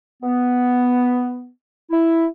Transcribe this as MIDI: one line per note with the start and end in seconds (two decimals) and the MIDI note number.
0.23 1.49 59
1.90 2.25 64